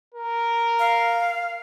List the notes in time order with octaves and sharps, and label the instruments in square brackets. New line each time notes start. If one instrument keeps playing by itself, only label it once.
[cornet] A#4
[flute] F5